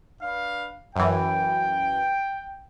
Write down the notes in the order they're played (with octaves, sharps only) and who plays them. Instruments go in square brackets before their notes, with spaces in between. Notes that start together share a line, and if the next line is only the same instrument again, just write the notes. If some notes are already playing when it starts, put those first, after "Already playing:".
[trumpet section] D4 B4 F5
[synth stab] F#2 E3 [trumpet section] G5